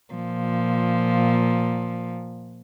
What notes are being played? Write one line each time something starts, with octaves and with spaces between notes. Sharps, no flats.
A#2 F3